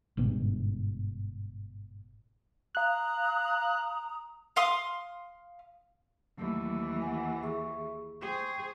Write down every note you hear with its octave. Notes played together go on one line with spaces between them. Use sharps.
G1 G#2 B2
F5 A#5 D#6 F#6
F5 C6 D#6
D#2 E3 F#3 A3 E6
F#5 G#5
G#4 E5 C#6
G#4 C5 G5 C#6